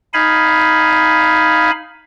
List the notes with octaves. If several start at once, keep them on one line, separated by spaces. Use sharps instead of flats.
D#4 F5 G#5 B5